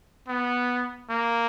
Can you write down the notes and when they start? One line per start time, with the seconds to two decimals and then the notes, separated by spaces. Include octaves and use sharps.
0.28 B3
1.10 A#3